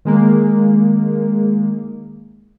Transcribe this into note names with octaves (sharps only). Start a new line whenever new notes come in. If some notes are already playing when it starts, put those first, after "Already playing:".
D#3 G#3 A#3